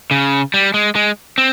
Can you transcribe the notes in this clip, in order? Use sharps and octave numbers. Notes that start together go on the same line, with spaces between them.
C#3
G3
G#3
G#3
C4